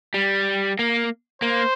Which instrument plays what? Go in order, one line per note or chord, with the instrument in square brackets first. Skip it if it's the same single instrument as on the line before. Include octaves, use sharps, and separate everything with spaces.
[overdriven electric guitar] G3
A#3
[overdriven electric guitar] A#3 [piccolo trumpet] C5